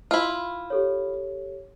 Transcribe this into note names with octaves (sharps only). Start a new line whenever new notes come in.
E4 F4
G4 A4 C#5